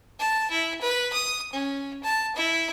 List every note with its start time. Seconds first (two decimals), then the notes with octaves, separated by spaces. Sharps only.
0.20 A5
0.51 E4
0.81 B4
1.13 D#6
1.53 C#4
2.03 A5
2.36 E4